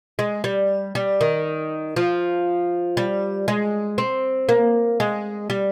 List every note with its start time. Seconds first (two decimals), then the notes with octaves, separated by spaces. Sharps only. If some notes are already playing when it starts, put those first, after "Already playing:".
0.19 G#3
0.44 G3
0.95 G3
1.21 D#3
1.96 F3
2.97 G3
3.48 G#3
3.98 C4
4.49 A#3
5.00 G#3
5.50 G3